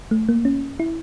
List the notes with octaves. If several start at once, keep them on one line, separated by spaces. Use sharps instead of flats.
A3
A#3
C#4
E4